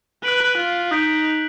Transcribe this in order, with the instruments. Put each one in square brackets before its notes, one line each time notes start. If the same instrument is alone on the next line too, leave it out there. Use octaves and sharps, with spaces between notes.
[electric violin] B4 [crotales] F#6 B6 D7 F#7
[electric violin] F4
[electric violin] D#4 [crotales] D#6 G6 B6 D7